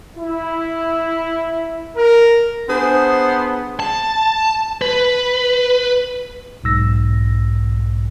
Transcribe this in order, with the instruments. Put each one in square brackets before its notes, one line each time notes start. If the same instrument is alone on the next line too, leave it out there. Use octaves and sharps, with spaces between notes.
[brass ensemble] E4
A#4
[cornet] B3 [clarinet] D4 [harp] G#4 [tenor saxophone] C5
[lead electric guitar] A5
B4
[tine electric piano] B1 G#2 E6 A#6